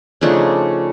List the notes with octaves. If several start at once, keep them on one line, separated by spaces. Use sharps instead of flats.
C#3 F3 A3 D4 D#4